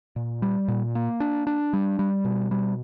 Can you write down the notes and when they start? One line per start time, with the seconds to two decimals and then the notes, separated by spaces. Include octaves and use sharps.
0.16 A#2
0.42 G3
0.68 A#2
0.95 A#3
1.20 D4
1.47 D4
1.73 G3
1.99 G3
2.25 B2
2.51 G3